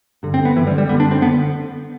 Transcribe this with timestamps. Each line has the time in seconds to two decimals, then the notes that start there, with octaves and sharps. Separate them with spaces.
0.23 G2 D3
0.34 C4
0.45 B3
0.56 G2 D3 E3
0.67 G3
0.78 G3
0.89 F#2 D3 B3
1.00 D4
1.11 C4
1.22 D3 B3